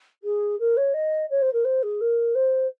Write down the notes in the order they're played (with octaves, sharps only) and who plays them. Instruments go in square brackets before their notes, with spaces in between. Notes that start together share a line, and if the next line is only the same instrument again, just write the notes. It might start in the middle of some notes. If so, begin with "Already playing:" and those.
[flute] G#4
A#4
C#5
D#5
C#5
C5
A#4
C5
G#4
A#4
C5